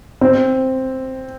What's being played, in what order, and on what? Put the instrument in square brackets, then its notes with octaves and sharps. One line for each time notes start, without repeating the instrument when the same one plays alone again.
[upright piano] C4